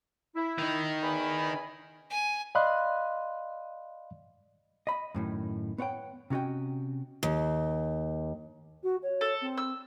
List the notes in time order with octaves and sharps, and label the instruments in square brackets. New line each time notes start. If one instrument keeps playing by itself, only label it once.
[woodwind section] E4
[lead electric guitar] D#3 D#4
[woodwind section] E2 G#5 B5
[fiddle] G#5
[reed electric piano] D5 D#5 F5 B5 C6 F#6
[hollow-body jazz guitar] D#5 B5
F#2 A2 D#3
B3 C#5 F#5 G5
C3 C#4 F#4 D#5 G5
[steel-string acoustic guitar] D#2
[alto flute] F#4
C#5
[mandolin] A4
[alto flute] C4
[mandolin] E6